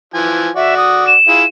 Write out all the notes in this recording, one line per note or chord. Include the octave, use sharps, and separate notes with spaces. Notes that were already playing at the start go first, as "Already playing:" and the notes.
E3 F3 G#5
F#4 D5 E5
D#6
E7
E4 F4 G#4